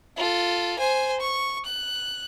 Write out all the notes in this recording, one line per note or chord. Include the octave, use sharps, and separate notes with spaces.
F4 A4
C5 G#5
C#6
F#6